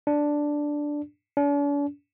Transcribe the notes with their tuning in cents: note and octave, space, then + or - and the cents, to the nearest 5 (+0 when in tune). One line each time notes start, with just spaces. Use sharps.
D4 +0
D4 -45